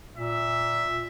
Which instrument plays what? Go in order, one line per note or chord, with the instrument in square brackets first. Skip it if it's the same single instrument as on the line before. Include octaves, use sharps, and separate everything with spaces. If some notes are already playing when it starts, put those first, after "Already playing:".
[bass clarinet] A#2 [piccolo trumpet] E5